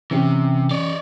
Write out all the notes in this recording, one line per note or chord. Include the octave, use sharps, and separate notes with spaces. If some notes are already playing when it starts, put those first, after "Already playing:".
C3 E3 C#4 G4
C#5 D5